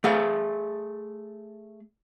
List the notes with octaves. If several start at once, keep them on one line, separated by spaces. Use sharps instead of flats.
A3 G#4 F5